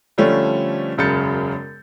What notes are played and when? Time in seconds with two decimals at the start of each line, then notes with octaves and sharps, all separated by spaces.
0.18 D3 F3 G3 A3 C#4
0.98 E1 F#2 C#3 G6 A6 C#7